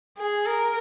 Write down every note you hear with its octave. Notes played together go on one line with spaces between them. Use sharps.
G#4
A#4